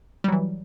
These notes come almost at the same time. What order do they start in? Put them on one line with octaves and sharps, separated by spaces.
G3 F#3 E3